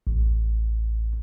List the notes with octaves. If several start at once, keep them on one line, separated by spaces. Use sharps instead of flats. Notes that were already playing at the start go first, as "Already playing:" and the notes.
A1